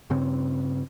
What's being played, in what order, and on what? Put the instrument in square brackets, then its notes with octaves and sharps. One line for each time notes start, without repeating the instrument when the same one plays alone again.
[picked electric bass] G2 C#3 C4